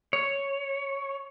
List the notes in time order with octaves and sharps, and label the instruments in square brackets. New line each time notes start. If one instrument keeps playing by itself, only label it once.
[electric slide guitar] C#5